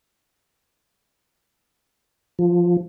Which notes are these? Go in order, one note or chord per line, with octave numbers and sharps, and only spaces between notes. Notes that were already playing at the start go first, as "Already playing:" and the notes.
F3